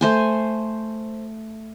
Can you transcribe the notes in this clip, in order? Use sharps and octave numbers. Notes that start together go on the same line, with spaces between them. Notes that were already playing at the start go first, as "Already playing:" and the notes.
A3 C5 G#5